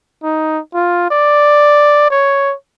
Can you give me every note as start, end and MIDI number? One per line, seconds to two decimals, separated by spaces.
0.23 0.59 63
0.74 1.08 65
1.11 2.07 74
2.11 2.54 73